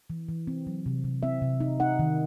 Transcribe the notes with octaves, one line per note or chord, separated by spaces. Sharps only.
E3
E3
C4
F#3
C3
C3
C4 E5
C3
D#4
D#4 F#5
D#3